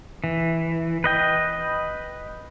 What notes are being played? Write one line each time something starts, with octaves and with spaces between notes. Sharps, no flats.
E3
B4 D#5 G5